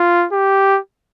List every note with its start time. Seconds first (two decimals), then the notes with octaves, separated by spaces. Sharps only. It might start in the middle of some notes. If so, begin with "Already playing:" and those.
Already playing: F4
0.32 G4